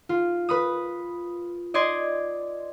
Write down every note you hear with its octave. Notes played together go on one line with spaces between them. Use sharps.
F4
B4 B5 D#6
D5 D#5 C6 G#6